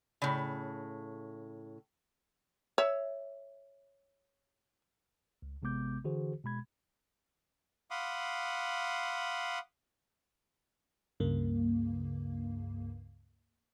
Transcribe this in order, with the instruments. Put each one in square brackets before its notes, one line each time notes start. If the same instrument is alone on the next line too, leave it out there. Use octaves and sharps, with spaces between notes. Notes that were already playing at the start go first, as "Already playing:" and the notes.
[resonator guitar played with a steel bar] A2 C#3
[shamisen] C#5 E5
[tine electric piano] C#2
A1 C3 G#3 B3 D6 G6
D3 E3 F#4 G#4 C5
B2 G#3 B5 G#6
[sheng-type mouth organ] F5 F#5 B5 C6 D6 D#6
[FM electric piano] C#2 G2 C#3 A#3